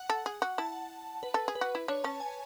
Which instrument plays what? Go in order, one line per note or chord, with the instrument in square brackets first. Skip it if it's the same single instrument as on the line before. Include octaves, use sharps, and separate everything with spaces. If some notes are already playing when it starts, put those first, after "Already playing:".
Already playing: [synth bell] F#5
[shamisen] A4
G#4
F#4
[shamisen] E4 [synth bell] A5
[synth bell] B4
[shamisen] A4
G#4
[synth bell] B4
[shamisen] F#4
E4
[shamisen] D4 [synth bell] C#5
[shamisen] C#4 [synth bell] A5
[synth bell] G#5